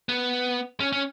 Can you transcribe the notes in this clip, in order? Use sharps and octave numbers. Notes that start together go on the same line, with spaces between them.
B3
C#4
C#4